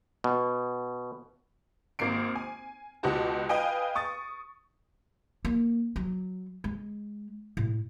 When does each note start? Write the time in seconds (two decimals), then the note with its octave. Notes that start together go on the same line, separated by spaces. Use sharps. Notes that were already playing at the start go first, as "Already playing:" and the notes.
0.24 B2
1.99 G#1 A#3 C4 C7 D7
2.35 G#5
3.03 C#2 B2 F#4 G4 A5
3.49 B4 D#5 F5 G5 G#5
3.95 C#6 D#6 A6
5.45 A#3
5.96 F#3
6.64 G#3
7.57 A2